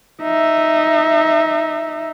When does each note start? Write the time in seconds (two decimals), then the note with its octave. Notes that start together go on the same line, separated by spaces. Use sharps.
0.22 D#4 E5